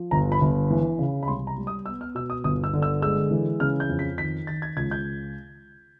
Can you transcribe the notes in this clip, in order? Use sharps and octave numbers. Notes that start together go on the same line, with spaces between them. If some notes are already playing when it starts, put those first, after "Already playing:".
Already playing: F3
G1 A#5
B5
G1
E3
C#3
B5
C2 C6
A#5
G3
D#6
B3 E6
F6
B2 E6
D#6
G1 D#6
E6
D3
E6
G#3 E6
E3
C#3 F6
G6
F2
B6
D#3 B6
D#3 A6
G#6
C#2 G#6
G6